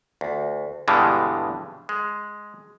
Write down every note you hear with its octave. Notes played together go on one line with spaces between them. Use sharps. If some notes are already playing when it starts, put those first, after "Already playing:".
D2
G2 B2 D3 E3 G3 G#3
G#3